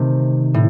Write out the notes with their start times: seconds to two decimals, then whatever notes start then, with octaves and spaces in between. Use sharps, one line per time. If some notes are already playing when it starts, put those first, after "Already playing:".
Already playing: C3 D#3 A3 C4
0.54 A2